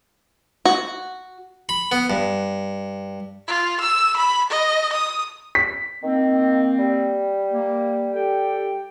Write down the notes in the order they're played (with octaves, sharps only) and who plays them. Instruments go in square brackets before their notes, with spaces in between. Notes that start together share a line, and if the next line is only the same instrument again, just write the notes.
[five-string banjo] F#4
[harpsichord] B5
B3
G2
[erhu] F4
E6
B5
D#5
D#6
[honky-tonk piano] B6
[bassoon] D#3 [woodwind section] A#3 C4
[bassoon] G3
[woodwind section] A#3
G4 A4 G5